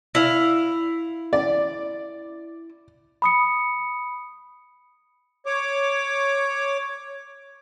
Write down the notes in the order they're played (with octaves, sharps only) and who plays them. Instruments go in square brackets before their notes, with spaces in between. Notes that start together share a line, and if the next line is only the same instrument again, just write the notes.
[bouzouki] E4 F5
[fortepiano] D5
[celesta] B5 D#6 C#7
[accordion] C#5 D6